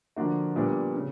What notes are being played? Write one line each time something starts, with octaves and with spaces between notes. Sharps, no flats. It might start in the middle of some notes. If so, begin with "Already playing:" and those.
D3 F3 A#3 D4 F#4
A#2 G3 B3 D4
C#3